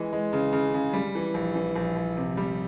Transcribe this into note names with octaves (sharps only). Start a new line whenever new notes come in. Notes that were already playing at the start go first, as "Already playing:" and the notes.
Already playing: E3 G#3
G#3
C#3
C#3
C#3
G3
E3
A#1
E3
A#1
A#1
C3
G3